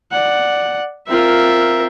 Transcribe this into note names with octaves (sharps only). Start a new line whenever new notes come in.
D5 F#5
C4 F4 A#4 E5